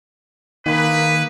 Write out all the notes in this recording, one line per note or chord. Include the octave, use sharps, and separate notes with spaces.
D#3 A#3 G#4 B4